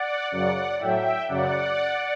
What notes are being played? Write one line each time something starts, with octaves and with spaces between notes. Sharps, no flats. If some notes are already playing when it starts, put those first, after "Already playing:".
Already playing: D5 F#5
F#2 C#3 F#3 D5 F#5
A2 F#3 E5 G5
F#2 C#3 F#3 D5 F#5